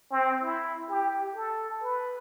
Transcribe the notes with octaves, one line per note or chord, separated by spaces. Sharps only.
C4
E4
G4
A4
B4